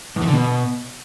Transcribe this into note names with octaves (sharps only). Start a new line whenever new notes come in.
E2
E3
D3
B2